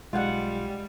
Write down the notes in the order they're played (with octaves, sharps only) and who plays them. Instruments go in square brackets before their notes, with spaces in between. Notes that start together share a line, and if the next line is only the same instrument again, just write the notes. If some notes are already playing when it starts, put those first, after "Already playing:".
[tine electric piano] B1 F4 [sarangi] G3 [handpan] G#3 F#5